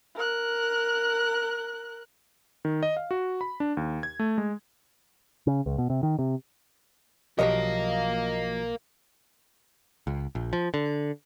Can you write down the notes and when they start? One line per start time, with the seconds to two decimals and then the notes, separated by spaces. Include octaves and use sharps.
0.16 A#4 F#6
2.65 D#3
2.83 D#5
2.97 F5
3.11 F#4
3.41 B5
3.60 D4
3.77 D#2
4.03 G#6
4.19 A3
4.38 G#3
5.47 C#3
5.66 C#2
5.78 B2
5.90 C3
6.03 D#3
6.19 C3
7.39 B1 F3 F#3 G4 A#4 D#5 F5
10.07 C#2
10.35 A#1
10.53 F3
10.74 D3